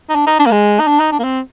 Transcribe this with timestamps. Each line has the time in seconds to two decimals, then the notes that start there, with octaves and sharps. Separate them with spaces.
0.10 D#4
0.15 D4
0.27 D#4
0.40 D4
0.46 A#3
0.52 G#3
0.80 D#4
0.88 D4
1.00 D#4
1.12 D4
1.19 A#3
1.24 C4